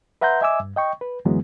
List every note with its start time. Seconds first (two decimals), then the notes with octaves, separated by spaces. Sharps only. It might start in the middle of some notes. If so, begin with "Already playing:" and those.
0.21 B4 E5 F#5 A#5 C6 G6
0.41 D#5 E5 G#5 D6 E6
0.60 G2
0.76 D#5 G5 C#6
1.01 B4
1.25 F#2 D3 E3 F#3 G#3 B3